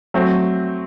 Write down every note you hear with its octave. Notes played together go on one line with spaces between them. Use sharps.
F#3 A3 C4